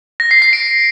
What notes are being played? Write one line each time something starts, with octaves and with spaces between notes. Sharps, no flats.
A#6
C7
C7
D7